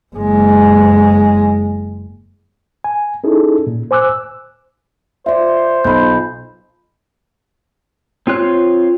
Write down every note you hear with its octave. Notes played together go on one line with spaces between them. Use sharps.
F#1 G#3
G#5
C#4 D#4 E4 G#4 A4
A#2
C5 G#5 D6 E6 F#6
F4 C5 D5 E5
B1 F4 B5 G6
C4 F4 C#5 F#6